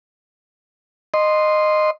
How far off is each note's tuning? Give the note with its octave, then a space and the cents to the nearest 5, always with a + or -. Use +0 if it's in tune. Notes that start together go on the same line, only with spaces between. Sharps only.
D#5 -15 C6 +0